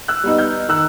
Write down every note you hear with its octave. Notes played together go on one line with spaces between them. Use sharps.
E6 F#6
G3 B3 D#4
F6 G6
D#3 E6 F#6